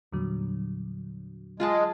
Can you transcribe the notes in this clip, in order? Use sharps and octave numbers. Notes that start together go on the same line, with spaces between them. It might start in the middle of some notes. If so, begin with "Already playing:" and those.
E2 A#2 D3 F#3 G3
G#3 F4 G#4 A5